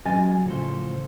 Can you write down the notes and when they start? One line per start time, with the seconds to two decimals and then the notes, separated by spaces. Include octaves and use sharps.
0.05 F#3 G#3 C#4 D#5 G#5
0.46 A2 C#3 F3 A4 C5